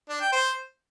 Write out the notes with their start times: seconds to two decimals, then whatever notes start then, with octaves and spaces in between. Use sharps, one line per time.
0.09 D4
0.21 G5
0.32 C5